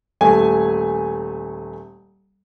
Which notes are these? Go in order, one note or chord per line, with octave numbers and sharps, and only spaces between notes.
D#1 A3 G#5